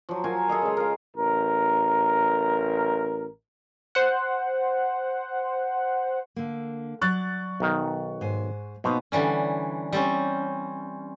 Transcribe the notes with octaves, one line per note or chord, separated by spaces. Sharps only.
F3 F#3
F#3 F4 A#4 G#5
G#4 A4 D#5 F5
C#3 G#3
A#4 F5
A1 A#4
C5 F#5
D3 A#3
F#3 D5 C#6 F#6 A6
B1 D#3
G#2 C5 G#5
B2 A#3 B3 D#4 C5
D3 E3 G3 C#4
G3 C4 C#4